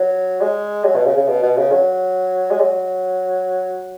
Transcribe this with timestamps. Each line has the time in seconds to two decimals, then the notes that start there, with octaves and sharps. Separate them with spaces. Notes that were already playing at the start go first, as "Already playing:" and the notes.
Already playing: F#3
0.41 G#3
0.85 F#3
0.95 B2
1.06 C#3
1.17 C#3
1.28 B2
1.43 B2
1.58 C#3
1.72 F#3
2.51 G#3
2.60 F#3